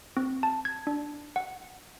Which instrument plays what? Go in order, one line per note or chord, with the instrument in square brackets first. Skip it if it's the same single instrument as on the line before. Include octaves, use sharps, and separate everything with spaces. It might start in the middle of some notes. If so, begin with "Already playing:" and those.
[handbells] C4
A5
G#6
D4
F#5